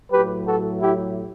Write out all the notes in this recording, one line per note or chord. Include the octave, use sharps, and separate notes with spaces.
A2 F#3 G4 B4
F#4 A4
E4 G4